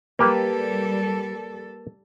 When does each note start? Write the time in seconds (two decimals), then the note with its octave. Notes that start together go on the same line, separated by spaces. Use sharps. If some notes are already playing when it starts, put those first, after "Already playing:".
0.19 G3 A#3 G4 A4 B4